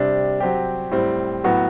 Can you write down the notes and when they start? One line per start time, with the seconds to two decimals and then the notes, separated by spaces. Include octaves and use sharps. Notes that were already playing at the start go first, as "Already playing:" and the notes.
Already playing: C3 G3 D4
0.40 F#3 C4 G4
0.91 A2 G3 C4
1.44 A2 F#3 B3 F#4